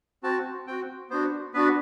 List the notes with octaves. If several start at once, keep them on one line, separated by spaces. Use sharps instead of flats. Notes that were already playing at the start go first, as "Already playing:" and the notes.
C4 F#4 A5
C4 F#4 G5
B3 D4 F#4 C5
B3 D4 F#4 B4